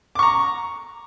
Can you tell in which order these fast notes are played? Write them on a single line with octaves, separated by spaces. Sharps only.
D6 C#6 A#5